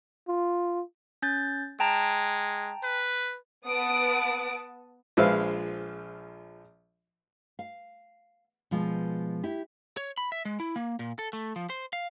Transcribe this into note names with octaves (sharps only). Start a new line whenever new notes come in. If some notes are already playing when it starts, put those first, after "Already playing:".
F4
C#4 G6 A6
G#3 G5 A5 A#5
B4
B3 B4 F#5 A5 D#6 D7
A#1 F3 G#3 B4 E5 F5
F5
B2 F3 G#3
E4 G4
C#5
B5
E5
G#3
E4
A#3
A#2
A4
A3
F3
C5
F5